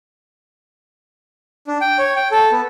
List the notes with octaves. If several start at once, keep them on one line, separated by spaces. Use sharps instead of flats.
D4
G5
C#5
G5
A4
B3